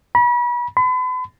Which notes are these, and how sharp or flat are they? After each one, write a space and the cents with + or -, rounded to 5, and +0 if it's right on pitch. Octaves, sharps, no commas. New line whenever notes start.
B5 -35
B5 +40